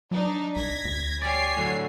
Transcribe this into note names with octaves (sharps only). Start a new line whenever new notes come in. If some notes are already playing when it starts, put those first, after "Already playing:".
F#3 D4 D#4
C2 G#6 A#6 B6
D2
G4 C#5 D5 G#5 C7
A2 D3 F#3